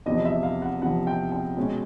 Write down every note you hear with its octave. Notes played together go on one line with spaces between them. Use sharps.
E2 C3 F3 D#5
E5
F5
F#5
E2 C3 F3 F#5
G5
G5
B2 G#3 C#4